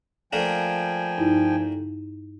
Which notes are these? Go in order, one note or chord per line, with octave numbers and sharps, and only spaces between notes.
F3 A3 A#3 D4 G5 G#5
G2 D#4 E4